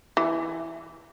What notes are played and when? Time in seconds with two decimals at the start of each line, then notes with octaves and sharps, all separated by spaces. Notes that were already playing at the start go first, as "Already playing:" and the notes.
0.17 E3